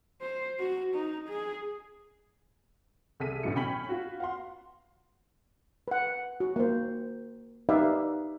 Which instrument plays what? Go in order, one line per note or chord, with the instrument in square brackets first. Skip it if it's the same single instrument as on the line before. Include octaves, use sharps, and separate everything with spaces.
[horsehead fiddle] C5
F#4
D#4
G#4
[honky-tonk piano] C2 G#4 A4 B6 D#7
A1 D2 B2 F#3 E4 C#7
C#4 G5 B5 B6 F#7
F4 F#4
F5 F#5 C6
[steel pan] B4 F#5
F#4
A#3 C5
D#4 G4 B4 D5 E5 F5